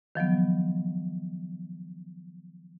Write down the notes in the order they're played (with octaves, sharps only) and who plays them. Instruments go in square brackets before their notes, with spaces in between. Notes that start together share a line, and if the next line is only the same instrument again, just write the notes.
[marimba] D#3 F3 F#3 B3